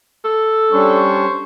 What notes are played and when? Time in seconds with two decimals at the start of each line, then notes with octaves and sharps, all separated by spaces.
0.25 A4
0.72 G3 C#4 D4 C5 C#5 C#6